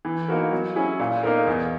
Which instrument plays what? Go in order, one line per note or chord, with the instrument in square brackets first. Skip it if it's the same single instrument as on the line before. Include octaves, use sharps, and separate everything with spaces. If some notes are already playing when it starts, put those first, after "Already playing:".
[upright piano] E3
A#3 D#4 F#4 A#4
F#3
C#4 E4 G#4
A#2
A#3 D#4 A#4
E2